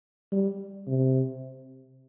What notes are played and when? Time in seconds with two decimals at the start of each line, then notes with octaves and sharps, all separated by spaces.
0.32 G3
0.87 C3